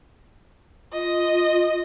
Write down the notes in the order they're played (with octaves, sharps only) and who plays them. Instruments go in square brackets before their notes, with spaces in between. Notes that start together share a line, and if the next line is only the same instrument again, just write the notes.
[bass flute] F4 [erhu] D#5